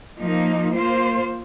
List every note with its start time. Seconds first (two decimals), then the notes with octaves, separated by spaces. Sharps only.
0.20 F3 A#3 D#4
0.75 A#3 F4 C5